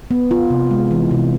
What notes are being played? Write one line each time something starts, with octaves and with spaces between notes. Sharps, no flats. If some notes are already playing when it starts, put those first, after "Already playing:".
B3
F4
C3
G#3
E3
C3